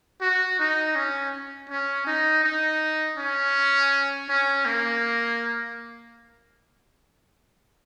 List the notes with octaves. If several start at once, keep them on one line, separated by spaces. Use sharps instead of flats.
F#4
D#4
C#4
C#4
D#4
D#4
C#4
C#4
A#3